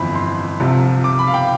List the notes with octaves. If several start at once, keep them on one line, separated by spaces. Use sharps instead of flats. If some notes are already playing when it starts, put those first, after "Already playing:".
Already playing: G1 F2 E3 B5
C6
C2 C3 F3
D6
B5
F5
G5